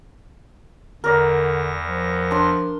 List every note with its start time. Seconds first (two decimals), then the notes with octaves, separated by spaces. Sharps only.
1.04 E2 D3 A#4 D5 A#6
1.87 F3
2.31 D4 C6